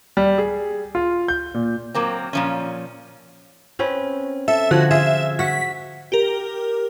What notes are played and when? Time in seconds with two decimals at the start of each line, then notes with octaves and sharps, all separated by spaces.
0.17 G3
0.38 G#4
0.95 F4
1.28 G6
1.54 A#2
1.95 F#3 A#3 C4
2.33 A#2 F3 C#4
3.79 C4 C#4 B4
4.48 A4 E5
4.71 D3 F3 F#4 G#6
4.91 F4 G#4 E5
5.39 F#4 F#5 B6
6.12 G4 A#4